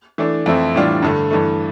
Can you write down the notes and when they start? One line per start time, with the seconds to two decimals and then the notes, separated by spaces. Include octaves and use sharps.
0.18 E3 A3 D4
0.46 F2 E3 A3 C4 E4
0.75 A2 E3 G3 D4 F4
1.02 G2 D3 A3
1.31 G2 E3 A3